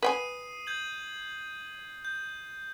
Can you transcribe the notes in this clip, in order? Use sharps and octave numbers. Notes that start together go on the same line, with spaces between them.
B4 G5 G#5 D#6 C7 D#7
G6 G#6 F#7
G6